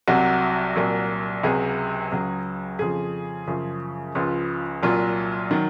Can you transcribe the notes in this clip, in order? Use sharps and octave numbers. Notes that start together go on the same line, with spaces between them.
C2 C3 F#3 F#4
C2 A#2 F#3
C#2 C3 F#3 G#4
C#2 C#3 F#3
F2 C#3 F3 G#4
F#2 C#3 F3
C#2 C#3 F3 F4
C2 A#2 F#3 F4
D#3 F#3